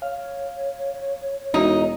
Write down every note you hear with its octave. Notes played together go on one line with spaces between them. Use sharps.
C#5 F5
E1 D#4 E4 F#4